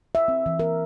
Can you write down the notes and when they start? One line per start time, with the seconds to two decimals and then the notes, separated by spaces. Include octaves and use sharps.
0.15 E5
0.28 C4
0.46 E3
0.60 A#4